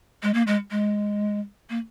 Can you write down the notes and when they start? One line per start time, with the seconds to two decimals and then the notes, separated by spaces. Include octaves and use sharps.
0.23 G#3
0.34 A#3
0.47 G#3
0.71 G#3
1.70 A#3